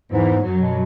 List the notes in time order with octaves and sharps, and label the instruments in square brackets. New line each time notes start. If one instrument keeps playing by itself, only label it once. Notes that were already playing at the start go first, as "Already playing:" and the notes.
[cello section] E2 E3 [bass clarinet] G#2
[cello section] F#2 F#3
[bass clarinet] B2